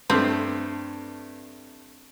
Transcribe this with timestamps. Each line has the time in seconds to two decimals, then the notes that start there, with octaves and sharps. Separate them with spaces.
0.10 G2 A3 C4